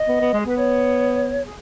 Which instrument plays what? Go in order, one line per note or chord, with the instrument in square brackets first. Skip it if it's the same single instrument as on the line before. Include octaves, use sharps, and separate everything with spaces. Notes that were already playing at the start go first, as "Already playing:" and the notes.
Already playing: [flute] D#5
[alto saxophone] B3
B3
G#3
[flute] G#4
[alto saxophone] B3 [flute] B4
[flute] C#5
G#4